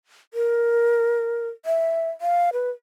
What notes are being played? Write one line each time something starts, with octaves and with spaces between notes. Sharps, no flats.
A#4
E5
F5
B4